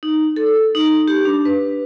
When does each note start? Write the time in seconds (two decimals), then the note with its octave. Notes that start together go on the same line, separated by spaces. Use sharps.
0.03 D#4
0.36 A4
0.75 D#4
1.08 G4
1.25 D4
1.45 B4